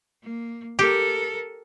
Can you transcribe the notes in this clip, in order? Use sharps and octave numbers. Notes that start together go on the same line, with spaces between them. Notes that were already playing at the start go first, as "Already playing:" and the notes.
A#3
G4 A4 A#4